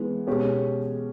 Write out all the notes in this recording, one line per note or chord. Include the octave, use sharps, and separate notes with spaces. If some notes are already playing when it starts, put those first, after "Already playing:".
Already playing: E3 G#3 B3
B2 G#3 C#4 G4